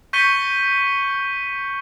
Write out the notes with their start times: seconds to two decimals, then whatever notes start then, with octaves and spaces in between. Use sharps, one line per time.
0.13 C#6 G6 B6 C#7 D#7 G7